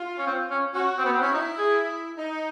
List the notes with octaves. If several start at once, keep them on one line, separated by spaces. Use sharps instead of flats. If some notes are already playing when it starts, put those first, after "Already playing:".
Already playing: F4
C#4
C4
C#4
C#4 F#4
C4
B3
C4
C#4 E4
D#4
G#4
D#4